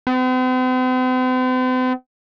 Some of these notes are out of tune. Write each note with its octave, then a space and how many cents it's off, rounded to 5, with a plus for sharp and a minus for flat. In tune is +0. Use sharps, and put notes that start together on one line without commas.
C4 -45